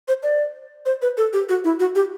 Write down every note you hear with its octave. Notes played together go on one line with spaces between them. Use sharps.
C5
D5
C5
B4
A4
G4
F#4
E4
F#4
G4